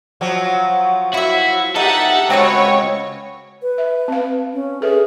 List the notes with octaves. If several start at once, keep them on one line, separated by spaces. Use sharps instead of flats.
F3 F#3
E4 F#4 E5
D#4 G4 A4 E5 F#5
C#2 C4 F#4 B4 C#5
B4
E5
C4 F5
C#4
G#4 A4 B4 E5